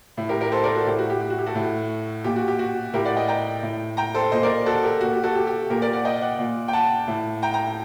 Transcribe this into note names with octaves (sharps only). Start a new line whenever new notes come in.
A2
G4 A#4
G4 A#4
A4 C5
A#4 D5
F#4 A4
A2 G4
F#4
G4
G4
F#4
G4
F#4 A4
A2
A#2 G4
F#4
G4
F#4
A2 G4 A#4
D5 F#5
D#5 G5
G5 A#5
A2
G5 A#5
A4 C5
A#2 C5 D#5
A#4 D5
F#4 A4
G4 A#4
A#2 F#4
G4
F#4 A4
G4
G4
A#2 G4 A#4
A#4 D5
D5 F#5
D#5 G5
D5 F#5
A#2
G5
F#5 A5
A2
G5 A#5
G5 A#5